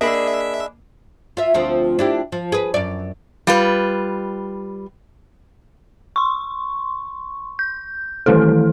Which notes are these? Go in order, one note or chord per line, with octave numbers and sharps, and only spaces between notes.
A#3 D4 G#4 D#5 E5 B5
F4 E5
D2 F3 C4
D4 E4 G4
F3
G#4 B4
F#2 D5
G3 F4 B4
C6 C#6
G6
D#3 E3 A3 E4 A4